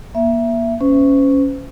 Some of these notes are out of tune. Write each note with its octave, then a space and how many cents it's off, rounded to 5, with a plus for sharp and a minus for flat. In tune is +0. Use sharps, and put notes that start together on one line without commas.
A#3 +30 E5 +15
C#4 +0 C5 -40